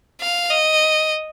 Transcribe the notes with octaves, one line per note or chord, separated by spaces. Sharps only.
F5
D#5